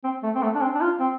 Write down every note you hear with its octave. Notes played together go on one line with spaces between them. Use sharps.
C4
A3
C4
A3
D4
C4
D4
F4
C4